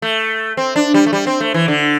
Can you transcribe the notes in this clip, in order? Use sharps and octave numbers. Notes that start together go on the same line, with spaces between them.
A3
C4
D4
G3
A3
G3
C4
A3
E3
D3